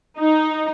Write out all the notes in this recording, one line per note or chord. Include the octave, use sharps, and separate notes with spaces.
D#4